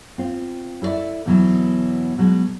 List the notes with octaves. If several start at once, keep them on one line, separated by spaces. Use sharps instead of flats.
C4 F4
E4 A4 C5 D5 E5
E2 B2 E3 F#3
B2 F#3 G#3